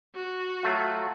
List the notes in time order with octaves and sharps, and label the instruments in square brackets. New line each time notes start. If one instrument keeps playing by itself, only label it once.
[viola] F#4
[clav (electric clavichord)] F#3 A3 F4